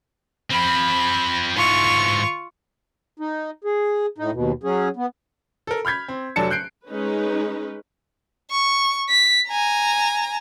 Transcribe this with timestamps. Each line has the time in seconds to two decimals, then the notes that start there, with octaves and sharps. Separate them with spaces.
0.51 F3 C4 B5
1.56 G#2 E3 F4 C#6
3.19 D#4
3.64 G#4
4.18 A2 D#4
4.32 D#2 B2
4.63 F#3 C#4 G#4
4.96 B3
5.67 A4 A#4
5.85 B5 F6 G6 G#6 B6
6.08 C4
6.36 F1 F#3 D4 A4 A5 C#7
6.50 F#6 G6 C7 D7
6.87 G#3 C#4 D#4 B4
8.51 C#6
9.09 B6
9.49 G#5 A#5